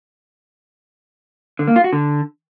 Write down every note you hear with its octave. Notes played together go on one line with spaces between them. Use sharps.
D3
A#3
F4
F#4
D3